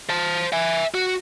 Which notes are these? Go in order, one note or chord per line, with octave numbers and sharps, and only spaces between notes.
C5 A5
E5 G#5
F#4